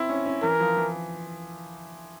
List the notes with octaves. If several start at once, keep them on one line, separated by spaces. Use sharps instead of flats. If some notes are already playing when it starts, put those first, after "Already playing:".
Already playing: C4 E4
C#4
C#4
E3 A#4
F3
E3